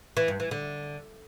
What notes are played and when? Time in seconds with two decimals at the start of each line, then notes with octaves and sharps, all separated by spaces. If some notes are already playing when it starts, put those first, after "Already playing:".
0.17 E3
0.28 G2
0.40 E3
0.51 D3